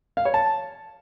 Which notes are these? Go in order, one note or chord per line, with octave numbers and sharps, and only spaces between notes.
F5
C#5
A5